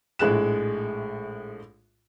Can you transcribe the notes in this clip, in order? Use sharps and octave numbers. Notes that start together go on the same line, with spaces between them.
A#1 A2 G#3 F#6 E7